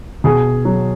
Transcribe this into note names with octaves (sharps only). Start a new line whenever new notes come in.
B2 G#4
F#3